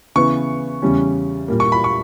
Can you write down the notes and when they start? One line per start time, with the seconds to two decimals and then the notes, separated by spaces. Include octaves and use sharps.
0.16 C#3 E3 B3 C#6
0.82 E2 C#3 G3 C#4
1.48 A#2 G3 A#3
1.60 C#6
1.72 B5
1.84 C#6